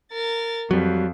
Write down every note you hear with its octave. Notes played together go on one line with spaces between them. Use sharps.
A#4 A6
F2 F#3 G3